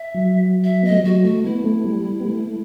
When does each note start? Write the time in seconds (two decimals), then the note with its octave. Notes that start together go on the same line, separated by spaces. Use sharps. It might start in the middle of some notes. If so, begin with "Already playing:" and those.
Already playing: E5
0.14 F#3
0.64 E5
0.83 B3 D#5
0.90 A3
0.97 G3
1.04 F#3 F#4
1.24 A3 F#4
1.44 B3 E4
1.64 A3
1.84 G3
2.04 G3
2.20 B3
2.25 A3